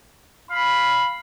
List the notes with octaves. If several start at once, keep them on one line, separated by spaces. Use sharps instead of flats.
F5 B5